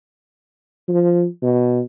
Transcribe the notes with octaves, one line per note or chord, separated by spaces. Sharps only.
F3
B2